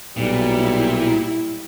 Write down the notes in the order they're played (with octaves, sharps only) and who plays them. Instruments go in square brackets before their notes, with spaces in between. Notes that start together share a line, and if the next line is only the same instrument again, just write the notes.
[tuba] B1 [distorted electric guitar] A#2 [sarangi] G3 [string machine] E4